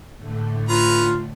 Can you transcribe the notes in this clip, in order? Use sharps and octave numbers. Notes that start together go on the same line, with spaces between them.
A2 D3 A3
C#4 F4 B4 A#5